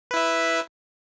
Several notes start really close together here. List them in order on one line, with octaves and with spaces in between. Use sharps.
B4 E4 E5